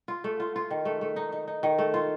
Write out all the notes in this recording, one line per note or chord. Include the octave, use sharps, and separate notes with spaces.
F4
A3
F4
F4
D#3
A3
A3
D#4
D#4
D#4
D#3
A3
F4